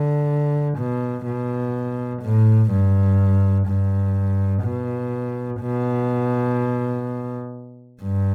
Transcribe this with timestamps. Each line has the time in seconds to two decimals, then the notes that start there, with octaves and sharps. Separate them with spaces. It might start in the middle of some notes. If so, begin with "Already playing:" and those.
Already playing: D3
0.78 B2
1.26 B2
2.22 A2
2.71 G2
3.67 G2
4.64 B2
5.61 B2
8.02 G2